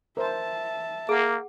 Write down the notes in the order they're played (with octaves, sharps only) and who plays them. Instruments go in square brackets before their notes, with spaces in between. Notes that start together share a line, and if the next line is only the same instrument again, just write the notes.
[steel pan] A#4 C5 [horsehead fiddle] E5 A5
[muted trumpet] A#3 [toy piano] G#4 F#5